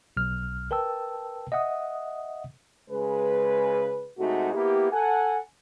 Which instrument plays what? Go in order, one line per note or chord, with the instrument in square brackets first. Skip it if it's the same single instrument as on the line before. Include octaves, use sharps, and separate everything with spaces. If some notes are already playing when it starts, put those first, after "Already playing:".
[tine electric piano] B1 F6
A#4 B4 G5 A5 E6
D#5 E5 F#5 D#6
[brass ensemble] C#3 G#3 B4
C3 G#3 A3 D#4 F#4
A#3 B3 E4 G4
A4 F#5 G#5